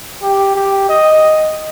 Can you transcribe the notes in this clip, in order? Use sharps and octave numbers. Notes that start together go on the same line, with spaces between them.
G4
G4
D#5